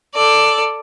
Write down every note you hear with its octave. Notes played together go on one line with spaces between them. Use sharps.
A4 D5